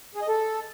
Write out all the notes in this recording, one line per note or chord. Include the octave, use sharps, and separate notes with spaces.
G#4
D#5
A4